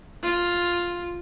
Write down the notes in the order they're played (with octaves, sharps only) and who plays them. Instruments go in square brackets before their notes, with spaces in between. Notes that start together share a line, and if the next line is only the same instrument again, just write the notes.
[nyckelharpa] F4